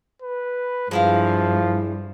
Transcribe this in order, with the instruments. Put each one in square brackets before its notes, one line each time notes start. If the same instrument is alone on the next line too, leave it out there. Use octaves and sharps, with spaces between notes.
[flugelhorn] B4
[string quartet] G2 [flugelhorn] F3 [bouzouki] G#3 E4 F5